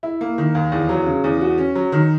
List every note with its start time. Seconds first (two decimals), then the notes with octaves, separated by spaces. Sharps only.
0.03 E4
0.21 A#3
0.38 D#3
0.55 D#2
0.72 E2
0.89 F#3
1.06 C#3
1.24 E2
1.41 F#4
1.58 C#4
1.75 F#3
1.92 D#3